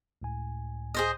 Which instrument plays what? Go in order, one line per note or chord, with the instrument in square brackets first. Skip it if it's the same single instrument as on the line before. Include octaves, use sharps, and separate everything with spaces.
[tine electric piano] C#2 A2 G#5
[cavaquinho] G#4 C5 D#5